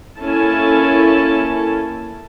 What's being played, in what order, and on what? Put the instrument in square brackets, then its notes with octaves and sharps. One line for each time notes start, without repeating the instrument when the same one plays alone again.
[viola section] A#3 C#4 E4 A4 A5